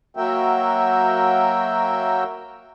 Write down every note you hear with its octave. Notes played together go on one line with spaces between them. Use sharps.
F#3 A#3 F#4 A#4 E5 G5